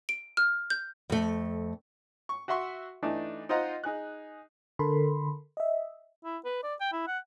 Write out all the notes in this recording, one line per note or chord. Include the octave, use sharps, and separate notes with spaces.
D7
F6
G6
F2 A3
C#6
F#4 E5 F#5 C6 C#6
E3 A3 D4 D#4
D#4 F4 C5 D#5 F#5 A#5
D#4 G#4 F#6
D3 A4 A#4 B5 C6
D#5 E5
E4
B4
D5
G5
E4
F#5